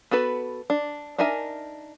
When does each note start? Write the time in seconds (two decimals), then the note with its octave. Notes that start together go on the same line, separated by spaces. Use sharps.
0.11 B3 F#4 A4 B4
0.70 D4
1.18 D4 D#4 A#4 E5 G#5